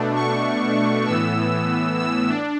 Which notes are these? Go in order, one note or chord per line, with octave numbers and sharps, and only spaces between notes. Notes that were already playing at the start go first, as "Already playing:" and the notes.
Already playing: B2 A3 D4
C#6
A2 E3 B3 E6
E6
D4